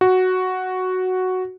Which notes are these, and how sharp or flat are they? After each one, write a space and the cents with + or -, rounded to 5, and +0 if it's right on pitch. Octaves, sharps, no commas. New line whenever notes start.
F#4 +0